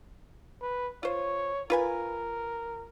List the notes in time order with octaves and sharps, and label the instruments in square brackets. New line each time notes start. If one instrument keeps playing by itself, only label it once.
[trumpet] B4
[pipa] F4 C5 [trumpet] C#5
[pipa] F4 B4 G#5 [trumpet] A#4